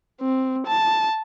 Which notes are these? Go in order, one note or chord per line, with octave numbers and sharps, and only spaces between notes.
C4
A5